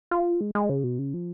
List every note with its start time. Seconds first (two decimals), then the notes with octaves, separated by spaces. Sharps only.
0.11 F4
0.41 G#3
0.55 G#3
0.70 C#3
0.84 B2
0.99 C#3
1.14 F3